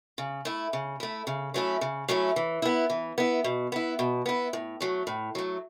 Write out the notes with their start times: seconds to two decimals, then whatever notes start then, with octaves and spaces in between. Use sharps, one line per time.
0.18 C#3
0.45 A3 E4
0.73 C#3
1.00 A3 E4
1.27 C#3
1.54 F#3 A3 C#4 E4
1.81 C#3
2.08 F#3 A3 C#4 E4
2.36 E3
2.62 B3 E4
2.90 E3
3.18 B3 E4
3.44 B2
3.72 B3 E4
3.99 B2
4.26 B3 E4
4.53 A2
4.81 F#3 A3
5.07 A2
5.35 F#3 A3